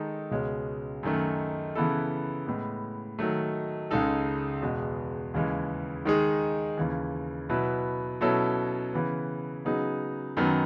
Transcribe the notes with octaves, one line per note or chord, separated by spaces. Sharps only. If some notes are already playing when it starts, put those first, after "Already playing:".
Already playing: D#3 G#3 D#4 A4
C#2 B2 G#3 C#4
F#2 D#3 A3
C#3 E3 B3 E4 A4
A2 G#3 B3
D#3 F#3 A3
C#2 C#3 G#3 D#4 A4
E2 B2 G#3
D#2 C#3 E3 G#3
D#3 G#3 D#4 G#4
D#2 C#3 E3
B2 F#3 B3 E4 B4
B2 F#3 C#4 E4 A4
C#3 E3 B3
C#3 F#3 B3 D#4 G#4
F#2 D#3 F#3 B3